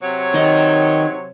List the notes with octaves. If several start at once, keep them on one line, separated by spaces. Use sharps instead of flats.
C3 F#3 C#5
D#3 D#4